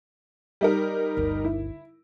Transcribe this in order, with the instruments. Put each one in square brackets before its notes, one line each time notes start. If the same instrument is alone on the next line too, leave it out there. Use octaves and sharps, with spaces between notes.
[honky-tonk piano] G3 D#4 A#4
[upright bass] G1 D2
[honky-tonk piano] E4